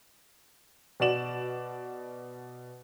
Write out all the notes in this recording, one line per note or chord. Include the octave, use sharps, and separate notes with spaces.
B2 F#4 D5 E7 F#7